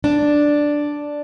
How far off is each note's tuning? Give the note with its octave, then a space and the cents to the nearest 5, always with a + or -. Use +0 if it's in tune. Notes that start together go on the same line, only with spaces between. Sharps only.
D4 +0